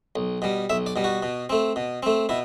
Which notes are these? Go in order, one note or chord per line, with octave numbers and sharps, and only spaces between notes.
B1
B2 G3
B1 E5
D5
B2 G3
F#4
B2
A3 C4
B2
A3 C4
B2 E4